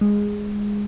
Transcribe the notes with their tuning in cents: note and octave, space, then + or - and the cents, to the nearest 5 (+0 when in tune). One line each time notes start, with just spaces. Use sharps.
G#3 -10